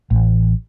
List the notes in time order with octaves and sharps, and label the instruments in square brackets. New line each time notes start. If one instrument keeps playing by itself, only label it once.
[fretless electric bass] A1